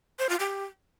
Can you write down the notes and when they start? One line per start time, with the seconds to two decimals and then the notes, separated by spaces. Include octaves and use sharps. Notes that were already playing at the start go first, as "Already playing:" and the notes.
0.19 C5
0.29 F4
0.40 G4